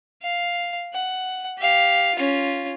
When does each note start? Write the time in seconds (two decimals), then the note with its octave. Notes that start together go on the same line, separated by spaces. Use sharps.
0.23 F5
0.94 F#5
1.59 G4 F5
2.15 C#4 F4